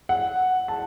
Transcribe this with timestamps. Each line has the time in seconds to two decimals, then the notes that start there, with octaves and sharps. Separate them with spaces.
0.09 F#5
0.68 A5